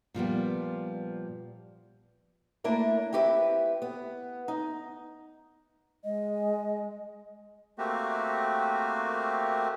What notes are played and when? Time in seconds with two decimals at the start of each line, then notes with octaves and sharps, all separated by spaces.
0.14 A#2 F3 G3 B3
2.64 A3 A#3 D4 E4 A#4
3.13 C4 E4 G4 B4 C5 E5
3.82 B3
4.48 D#4
6.04 G#3 D#5
7.78 A3 A#3 C4 F#4 G4